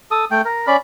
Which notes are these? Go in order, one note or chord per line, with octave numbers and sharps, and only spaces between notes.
A4 D#6
A3 G5
A#4
C#4 D5 B5